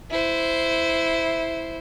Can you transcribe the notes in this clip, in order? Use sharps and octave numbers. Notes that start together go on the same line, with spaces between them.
E4 C5